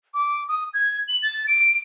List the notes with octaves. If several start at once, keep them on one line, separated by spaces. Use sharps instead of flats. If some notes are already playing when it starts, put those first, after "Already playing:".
D6
D#6
G#6
F#7
A6
D7